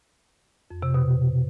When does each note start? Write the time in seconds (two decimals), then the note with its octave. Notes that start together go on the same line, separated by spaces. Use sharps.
0.71 F2
0.83 C3
0.94 B2